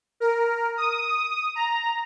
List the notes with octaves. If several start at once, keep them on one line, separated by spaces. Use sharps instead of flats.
A#4
D#6
A#5